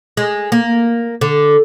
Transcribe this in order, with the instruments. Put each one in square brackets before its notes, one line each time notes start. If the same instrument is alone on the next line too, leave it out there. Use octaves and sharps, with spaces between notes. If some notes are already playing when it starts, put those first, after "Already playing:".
[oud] G#3
A#3
D3